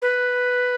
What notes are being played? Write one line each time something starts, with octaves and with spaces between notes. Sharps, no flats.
B4